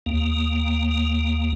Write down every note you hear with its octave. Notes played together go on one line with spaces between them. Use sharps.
D#2 A#3